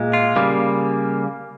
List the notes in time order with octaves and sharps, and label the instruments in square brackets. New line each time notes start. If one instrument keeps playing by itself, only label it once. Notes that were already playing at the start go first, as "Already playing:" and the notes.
Already playing: [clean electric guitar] A#2 G#3
F4
C#3 G3 A#3